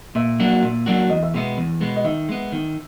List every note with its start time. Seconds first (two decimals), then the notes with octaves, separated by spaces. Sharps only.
0.15 A#2 E5
0.40 F#3 A#3 D4 F#4
0.63 A#2
0.86 F#3 A#3 D4 F#4
1.10 E2 D#5
1.23 E5
1.34 B2 G#3 B3 E5
1.58 E2
1.81 B2 G#3 B3
1.96 D#5
2.05 D#3 E5
2.29 G#3 B3
2.52 D#3